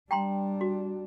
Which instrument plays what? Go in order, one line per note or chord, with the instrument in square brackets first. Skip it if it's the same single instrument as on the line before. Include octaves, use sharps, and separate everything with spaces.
[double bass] G3 D4 [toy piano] G5 A#5 C6
[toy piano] F#4